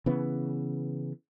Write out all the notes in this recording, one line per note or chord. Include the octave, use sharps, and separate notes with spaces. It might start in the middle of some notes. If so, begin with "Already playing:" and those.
C#3 E3 B3